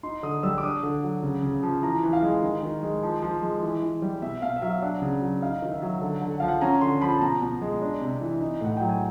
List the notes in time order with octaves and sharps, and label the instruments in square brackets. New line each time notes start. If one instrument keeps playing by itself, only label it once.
[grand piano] D#4 C6
D3 D#6
G3 E6
D6
D4 D#6
D3
F#3
C#3
C#3
F3
E3 A#5
E3
F5
G#3
D#3
D#3
G#3
F3
F3
G#3
E3
E3
G3
B2 E5
B2 F5
E5
F#3 F5
D4 F#5
C#3
F#3
D#4 F5
D#3
E5
F#3
D3
D3
F#5
F3 F5
F#5
C#4 A#5
D3 C6
F3 B5
A5
B2 A#5
B2
G#3
D4
C3
E3
D#4
A2 F#5
F#3 G5
G#5